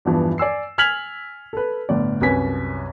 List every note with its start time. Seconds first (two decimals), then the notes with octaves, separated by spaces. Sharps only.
0.05 E2 G2 E3 F3
0.38 D5 G#5 E6 C7
0.78 G#5 F6 G#6 B6 F7 F#7
1.53 A4 B4
1.89 G1 A2 D5
2.21 C2 F#2 B4 G#5 B6